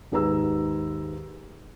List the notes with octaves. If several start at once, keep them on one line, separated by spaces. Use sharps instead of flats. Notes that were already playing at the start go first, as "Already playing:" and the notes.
D#2 G#2 G#4 B4 A#5 E6